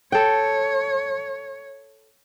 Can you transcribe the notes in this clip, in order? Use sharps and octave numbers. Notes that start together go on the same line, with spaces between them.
A4 C#5 G5